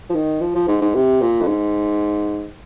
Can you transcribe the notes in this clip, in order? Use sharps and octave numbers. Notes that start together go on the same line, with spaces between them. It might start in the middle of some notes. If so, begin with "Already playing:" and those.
F3
D#3
F3
F3
G#2
G#2
C3
A#2
F2
G#2